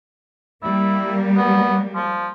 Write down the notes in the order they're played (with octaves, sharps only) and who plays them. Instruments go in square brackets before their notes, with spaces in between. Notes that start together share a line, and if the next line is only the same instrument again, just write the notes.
[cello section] G3 A#3 [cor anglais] E4
[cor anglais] B3
F3